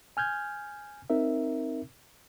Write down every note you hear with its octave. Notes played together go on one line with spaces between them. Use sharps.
G#5 F6 G6 G#6
C4 D#4 A#4 E5